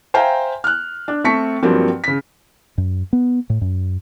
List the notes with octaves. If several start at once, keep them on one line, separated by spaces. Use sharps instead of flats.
C5 E5 F5 G5 G#5 A#5
F6 F#6
D4
A3 C4 A5 C#6 B6 C#7
G2 F3 F#3 A#3 C4
C#3 B6
F#2
B3
A2
F#2